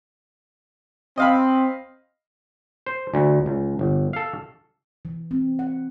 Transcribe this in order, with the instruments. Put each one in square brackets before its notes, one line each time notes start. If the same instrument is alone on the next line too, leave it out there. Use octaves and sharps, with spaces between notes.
[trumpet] C4 [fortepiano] D#5 F5 B5
[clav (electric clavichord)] C5
D2
C#2
G1
A4 F5
[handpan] E3
C4
F#5